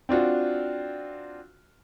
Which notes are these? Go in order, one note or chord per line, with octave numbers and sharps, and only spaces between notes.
C4 D4 F4 F#4